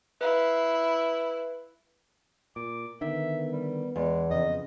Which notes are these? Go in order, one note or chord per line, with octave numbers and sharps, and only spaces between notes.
E4 B4 E5 F5
A#2 D6
D3 D#3 B3 E5
G3
E2 G#3
F2 C#3 D#5